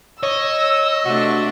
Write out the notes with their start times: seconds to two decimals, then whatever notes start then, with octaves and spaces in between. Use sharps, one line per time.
0.23 C#5 D#5 E6
1.05 C3 A3 D4 F#4